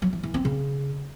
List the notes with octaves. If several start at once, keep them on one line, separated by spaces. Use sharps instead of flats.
F#3
E3
E3
C4
C#3